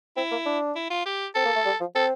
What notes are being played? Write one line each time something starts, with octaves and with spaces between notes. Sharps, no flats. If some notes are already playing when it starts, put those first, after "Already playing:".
C4 E4
A#3
D4
E4
F4
G4
C4 A4
A#3
A3
G3
F3
C4 A4